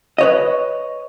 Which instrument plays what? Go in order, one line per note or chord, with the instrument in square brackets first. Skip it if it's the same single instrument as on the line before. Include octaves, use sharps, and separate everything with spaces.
[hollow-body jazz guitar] B4 C#5 D#5